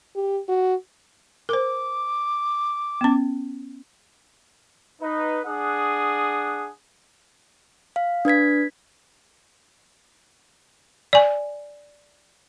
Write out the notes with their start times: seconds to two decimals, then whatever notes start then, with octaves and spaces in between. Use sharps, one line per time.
0.16 G4
0.49 F#4
1.49 A#4 C5 D6
3.01 B3 C#4
5.02 D#4 B4
5.46 D4 G#4 F#5 D#6
7.96 F5
8.25 D4 B4 G#6 B6
11.13 D5 G#5